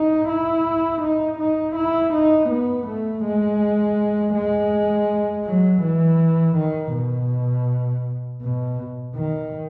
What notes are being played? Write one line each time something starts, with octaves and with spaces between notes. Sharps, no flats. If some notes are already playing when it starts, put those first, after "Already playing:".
Already playing: D#4
E4
D#4
D#4
E4
D#4
B3
A3
G#3
G#3
F#3
E3
D#3
B2
B2
D#3